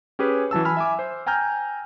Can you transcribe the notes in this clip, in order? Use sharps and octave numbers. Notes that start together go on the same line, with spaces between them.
C#4 G4 G#4 B4
E3 F#3 A5 E6
G#5 B5 E6 F6
E5 G#5 D6
C5
G5 G#5 A#5 F6 G6